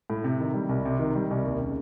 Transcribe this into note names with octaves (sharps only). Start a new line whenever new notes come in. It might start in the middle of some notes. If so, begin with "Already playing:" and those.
A2
C3
D#3
G3
C2
C3
D#3
G3
C2
D#2
C#3